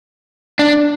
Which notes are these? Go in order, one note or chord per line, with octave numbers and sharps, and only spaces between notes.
D4